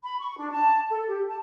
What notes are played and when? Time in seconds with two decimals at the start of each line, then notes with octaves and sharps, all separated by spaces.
0.03 B5
0.19 C#6
0.37 D4
0.52 A5
0.90 A4
1.08 G4
1.28 A5